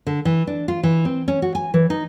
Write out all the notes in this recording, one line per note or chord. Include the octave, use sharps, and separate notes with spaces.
D3
E3
D4
F4
E3
C4
C#4
F#4
G#5
E3
D#4